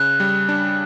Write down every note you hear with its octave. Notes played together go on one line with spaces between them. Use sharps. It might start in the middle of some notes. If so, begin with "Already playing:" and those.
Already playing: C#3 F#6
G3
D4